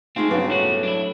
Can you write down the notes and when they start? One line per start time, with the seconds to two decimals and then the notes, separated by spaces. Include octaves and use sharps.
0.16 G#3 A3 C4 D#4 F4
0.31 G2 C#3 F#3 B3
0.50 A2 B3 F#4
0.83 D4 E4